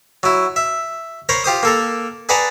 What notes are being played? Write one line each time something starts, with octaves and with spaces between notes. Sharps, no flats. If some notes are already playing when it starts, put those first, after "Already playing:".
F#3 E4
E5
A#4 C5 C#5 A#5 B5
F4 G4 C5 D#6
A#3 A4 A#4
G#4 B4 D5 F#5 A5 A#5